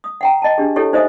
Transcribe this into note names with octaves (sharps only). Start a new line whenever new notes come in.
D#6
F#5 G5 A#5
D#5 A5
D4 G4 G#4
E4 G4 A4 C#5
D#4 C5 D#5 E5 G#5 D#6